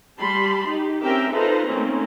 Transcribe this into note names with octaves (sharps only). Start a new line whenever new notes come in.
G3 G4 A5 B5 C6
D#4 G4
C4 C#4 G4 A#4 E5 G5
D#4 F4 A4 B4 C5 A#5
D#3 A3 A#3 C4 C#4